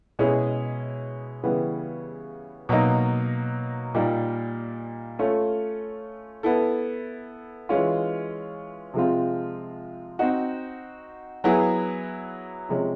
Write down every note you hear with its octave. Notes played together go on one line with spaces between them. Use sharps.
B2 G#3 C#4 E4 G#4
C#3 E3 G3 B3 E4
B2 F#3 A#3 D#4
A#2 G3 A#3 D#4
A3 C#4 F4 A4
B3 E4 A4
E3 G#3 C#4 F4
C3 F3 G#3 C4 F4
C4 D#4 F#4
F#3 B3 E4 G#4
C3 F3 G#3 C#4